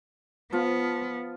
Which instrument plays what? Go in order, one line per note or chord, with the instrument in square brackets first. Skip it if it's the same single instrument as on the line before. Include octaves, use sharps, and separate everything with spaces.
[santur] F3 F4 [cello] B3